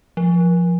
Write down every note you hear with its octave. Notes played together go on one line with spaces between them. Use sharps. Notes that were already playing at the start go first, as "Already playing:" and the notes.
F3